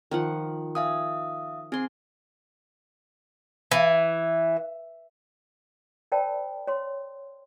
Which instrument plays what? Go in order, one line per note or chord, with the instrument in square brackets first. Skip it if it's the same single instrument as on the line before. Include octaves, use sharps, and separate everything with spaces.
[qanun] D#3 F3 F#5
[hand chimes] E5 F5 D#6 [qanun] G#5
[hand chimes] C4 [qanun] G#4 C6
[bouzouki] E3
[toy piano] A#4 C5 D5 G5 A5 B5
C#5 C6